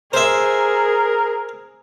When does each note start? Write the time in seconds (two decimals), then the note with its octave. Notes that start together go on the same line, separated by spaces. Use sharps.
0.13 G#4 A#4 C5 E5